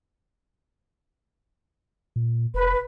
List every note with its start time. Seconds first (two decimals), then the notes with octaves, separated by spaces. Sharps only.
2.16 A#2
2.54 F1 B4